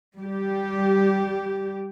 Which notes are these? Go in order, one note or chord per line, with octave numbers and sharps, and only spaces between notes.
G3 G4